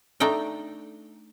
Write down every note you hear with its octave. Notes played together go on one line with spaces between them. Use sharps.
A3 D4 D#4 G5